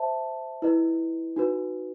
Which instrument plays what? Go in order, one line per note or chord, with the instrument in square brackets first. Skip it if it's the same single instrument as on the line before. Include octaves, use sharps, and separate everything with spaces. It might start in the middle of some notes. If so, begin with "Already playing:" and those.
Already playing: [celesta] C5 E5 A5
E4 B4 D#5
D#4 F#4 B4